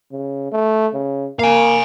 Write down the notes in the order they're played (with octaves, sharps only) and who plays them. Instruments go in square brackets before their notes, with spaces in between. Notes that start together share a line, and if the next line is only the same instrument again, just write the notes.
[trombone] C#3
A3
C#3
[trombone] A#3 [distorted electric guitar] F5 G#5